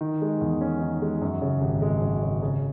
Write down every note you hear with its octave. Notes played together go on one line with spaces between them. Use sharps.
D#3
G#3
E2
C#4
D#3
G#3
F#2
C#3
G#1
G#3
F#2
C#3
C#3